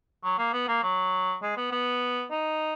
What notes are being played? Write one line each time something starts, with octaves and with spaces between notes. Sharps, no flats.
F#3
A#3
B3
A#3
F#3
G#3
B3
B3
D#4